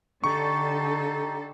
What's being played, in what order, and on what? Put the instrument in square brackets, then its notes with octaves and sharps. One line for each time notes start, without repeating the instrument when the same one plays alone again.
[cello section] D3 A4 [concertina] D#4 G4 [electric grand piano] C#6